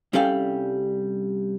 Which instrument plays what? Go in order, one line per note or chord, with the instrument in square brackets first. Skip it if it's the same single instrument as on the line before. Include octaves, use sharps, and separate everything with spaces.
[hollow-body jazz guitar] C2 G3 C#4 A4 F5 G5